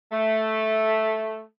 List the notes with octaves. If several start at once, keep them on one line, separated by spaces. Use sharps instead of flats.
A3